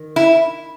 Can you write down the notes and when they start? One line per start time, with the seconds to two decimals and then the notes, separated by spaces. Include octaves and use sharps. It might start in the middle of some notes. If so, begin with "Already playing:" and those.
Already playing: D#3
0.16 E4